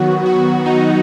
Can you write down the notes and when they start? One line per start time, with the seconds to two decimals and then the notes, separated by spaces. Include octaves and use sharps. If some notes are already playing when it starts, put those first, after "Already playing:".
Already playing: D#3 F#3 B3 F#4
0.26 F#4
0.66 D#4